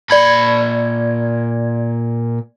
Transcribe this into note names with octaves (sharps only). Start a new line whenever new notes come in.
A#2 D5 B5 G#6